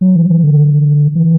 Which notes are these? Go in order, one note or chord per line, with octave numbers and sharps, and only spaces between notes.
F#3
E3
E3
D3
E3